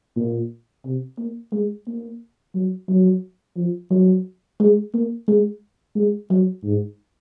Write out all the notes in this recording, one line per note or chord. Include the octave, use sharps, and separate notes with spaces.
A#2
C3
A#3
G#3
A#3
F#3
F#3
F3
F#3
G#3
A#3
G#3
G#3
F#3
G#2